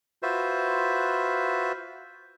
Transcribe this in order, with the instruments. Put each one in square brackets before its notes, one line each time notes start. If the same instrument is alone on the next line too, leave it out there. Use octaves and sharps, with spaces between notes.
[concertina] F4 F#4 B4 C5 E5